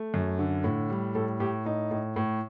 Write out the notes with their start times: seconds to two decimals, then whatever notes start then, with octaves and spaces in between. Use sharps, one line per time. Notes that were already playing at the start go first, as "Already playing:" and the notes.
Already playing: A3
0.14 F#2
0.39 D3
0.64 A2
0.90 G3
1.15 A2 A4
1.40 A2 G4
1.66 A2 D#4
1.91 A2
2.16 A2